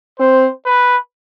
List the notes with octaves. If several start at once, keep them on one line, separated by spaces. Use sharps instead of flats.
C4 C5
B4